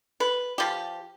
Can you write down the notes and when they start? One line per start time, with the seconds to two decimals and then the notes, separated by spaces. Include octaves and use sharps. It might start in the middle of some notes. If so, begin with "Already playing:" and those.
0.20 B4
0.58 F3 G4